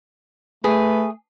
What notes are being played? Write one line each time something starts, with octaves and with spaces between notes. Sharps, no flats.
A3 G#4 B4